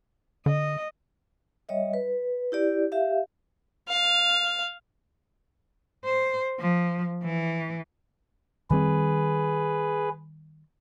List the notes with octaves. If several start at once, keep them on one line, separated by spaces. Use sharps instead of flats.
D3 D#5
G3 C#5 D#5 E5
B4
E4 G4 D5
G4 E5 F5
F5
C5
F3
E3
D#3 G3 C4 G#4 B4